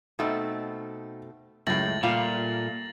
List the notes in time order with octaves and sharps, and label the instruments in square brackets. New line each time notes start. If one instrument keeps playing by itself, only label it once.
[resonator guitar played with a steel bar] B2 A3 C4 [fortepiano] D#4
[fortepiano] C#2 F#2 G#3 [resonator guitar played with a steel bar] A2 A3 [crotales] A6 A#6 F#7
[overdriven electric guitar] A#2 [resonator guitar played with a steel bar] G3 A3 F5 [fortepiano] F4